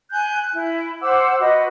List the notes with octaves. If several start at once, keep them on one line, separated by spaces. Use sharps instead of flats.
G#5 F#6 G6
E4
C5 F#5 D6 E6
F#4 B4 D#5